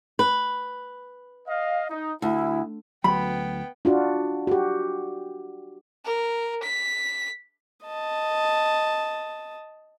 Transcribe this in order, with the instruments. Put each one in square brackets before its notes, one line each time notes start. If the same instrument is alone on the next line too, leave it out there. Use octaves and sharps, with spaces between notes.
[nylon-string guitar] B4
[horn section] D#5 F5
D#4
[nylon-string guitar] D2 [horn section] E4
[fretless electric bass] D2 F#3 [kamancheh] B3 G5 [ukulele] B5
[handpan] D4 F4 F#4
F#4 G4
[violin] A#4
B6
[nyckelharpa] D#5 A5